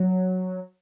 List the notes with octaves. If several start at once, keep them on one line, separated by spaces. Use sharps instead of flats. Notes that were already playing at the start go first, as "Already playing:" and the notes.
Already playing: F#3